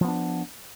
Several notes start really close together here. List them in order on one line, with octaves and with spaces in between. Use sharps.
F3 B3 D4